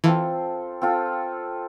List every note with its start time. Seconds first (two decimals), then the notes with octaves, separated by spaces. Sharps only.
0.04 E3 C4 F4 A4
0.82 C4 F4 A4